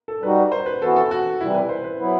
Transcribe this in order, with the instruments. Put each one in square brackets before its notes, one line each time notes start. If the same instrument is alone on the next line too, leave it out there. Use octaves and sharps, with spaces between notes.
[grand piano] A4
[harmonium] G3 D#4 F#4 [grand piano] B4
[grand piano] C5
B4
[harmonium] E3 B3 F#4 [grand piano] A4
[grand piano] A4
F#4
[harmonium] C3 E3 G3 [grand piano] E4
[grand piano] B4
C5
B4
[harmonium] F#3 B3 E4